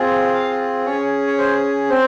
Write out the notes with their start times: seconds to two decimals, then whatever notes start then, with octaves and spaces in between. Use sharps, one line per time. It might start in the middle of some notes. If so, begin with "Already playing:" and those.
Already playing: C4 F4 G#4
0.34 F5
0.86 C#4 G#4 C#5
1.27 C#5
1.38 C5
1.90 C4 C5